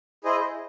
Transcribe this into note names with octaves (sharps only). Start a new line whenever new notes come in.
E4 G#4 C5 D#5